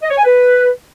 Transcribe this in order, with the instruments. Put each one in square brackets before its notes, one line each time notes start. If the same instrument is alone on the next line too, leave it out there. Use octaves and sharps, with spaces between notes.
[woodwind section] D#5
C#5
G#5
B4